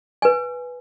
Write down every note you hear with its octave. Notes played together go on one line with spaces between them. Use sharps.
B4 G#5